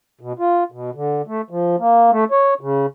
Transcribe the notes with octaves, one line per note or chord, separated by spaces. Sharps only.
B2
F4
B2
D3
A3
F3
A#3
A3
C#5
C#3